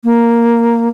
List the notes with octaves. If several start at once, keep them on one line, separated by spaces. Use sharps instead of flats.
A#3